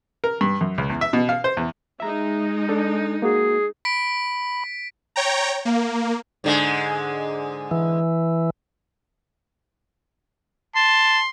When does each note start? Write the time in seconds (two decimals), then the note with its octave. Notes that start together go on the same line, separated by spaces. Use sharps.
0.24 A#4
0.41 G2
0.61 F#2
0.78 C#2
0.90 E2
1.01 E5
1.13 B2
1.29 F5
1.44 C5
1.57 E2
2.00 G#3 D#4 E5 A#5
2.69 D4 A4
3.22 A#3 F#4 G#4
3.85 B5 B6 D7
5.16 C#5 G5 A#5
5.65 A#3
6.44 G#2 D3 G#3
7.71 E3
10.76 A5 C6